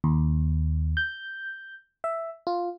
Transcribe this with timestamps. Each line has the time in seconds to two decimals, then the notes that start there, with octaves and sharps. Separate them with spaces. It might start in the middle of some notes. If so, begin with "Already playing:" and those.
0.04 D#2
0.97 G6
2.04 E5
2.47 F4